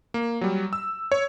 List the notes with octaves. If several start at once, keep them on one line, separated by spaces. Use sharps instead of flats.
A#3
F#3 G3
E6
C#5